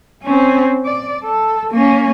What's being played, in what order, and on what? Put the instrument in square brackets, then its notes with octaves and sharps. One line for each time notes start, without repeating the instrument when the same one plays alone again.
[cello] C4 C#4
D5
A4
A#3 C#4